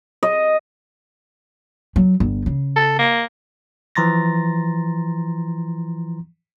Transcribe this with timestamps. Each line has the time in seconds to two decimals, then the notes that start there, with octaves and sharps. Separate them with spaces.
0.23 D#5
1.96 F#3
2.20 G1
2.46 C#3
2.76 A4
2.99 A#3
3.95 E3 F3 A#5 C6 A6 A#6